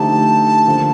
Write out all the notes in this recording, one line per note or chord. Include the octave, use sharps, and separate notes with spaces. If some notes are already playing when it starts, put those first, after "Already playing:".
Already playing: D3 F3 A3 D#4 G4 A5
D3 F3 A#3